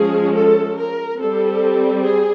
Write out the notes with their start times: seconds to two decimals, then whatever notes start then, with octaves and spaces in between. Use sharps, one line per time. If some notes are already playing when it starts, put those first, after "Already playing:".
Already playing: F3 G#3 C#4 G#4
0.36 A4
0.78 A#4
1.19 G3 C4 A4
2.02 G#4